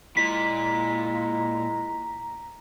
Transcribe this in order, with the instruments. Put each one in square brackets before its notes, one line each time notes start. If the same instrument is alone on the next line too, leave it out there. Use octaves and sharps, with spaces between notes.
[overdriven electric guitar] A#2 [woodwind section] G#3 E4 [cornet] A#5 [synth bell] B6